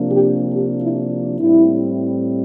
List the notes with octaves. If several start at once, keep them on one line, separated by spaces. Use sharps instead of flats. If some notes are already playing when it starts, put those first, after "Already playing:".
Already playing: C3 F3 A#3 D4
G4
G4
E4
A2 G3 C4 E4